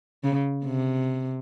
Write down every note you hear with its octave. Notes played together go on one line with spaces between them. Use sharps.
C#3
C3